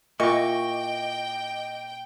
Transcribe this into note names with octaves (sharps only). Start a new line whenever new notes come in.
A#2 E4 D#5 G5 C#6 D6